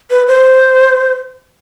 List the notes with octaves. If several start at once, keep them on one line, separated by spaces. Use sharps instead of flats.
B4
C5